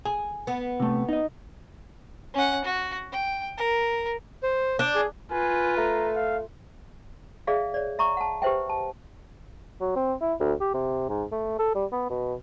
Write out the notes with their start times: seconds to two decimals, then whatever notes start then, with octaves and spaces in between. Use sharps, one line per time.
0.05 G#4 G#5
0.47 B3
0.80 C3 A3
1.09 D#4 D#5
2.34 C#4 F#5
2.65 F#4
3.12 G5
3.57 A#4
4.43 C5
4.79 D4 D6 G6
4.95 G#4
5.31 F4 B4 G#5
5.77 A3 A#5
6.16 F5
7.47 G#4 D5 E5 F5
7.74 C#5 D5
7.99 E5 A#5 C#6
8.17 F#5 A5
8.42 G4 B4 C5 E5 G5
8.70 A5
9.81 F#3
9.96 C4
10.22 E4
10.40 D2
10.61 G4
10.74 C3
11.09 G#2
11.32 A3
11.59 A4
11.75 G3
11.92 B3
12.10 B2